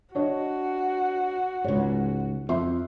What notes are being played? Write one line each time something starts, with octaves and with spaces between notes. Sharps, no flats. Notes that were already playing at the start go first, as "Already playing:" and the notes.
D4 F#4 C#5 D#5
C#2 G#2 C#5
F2 E5 C6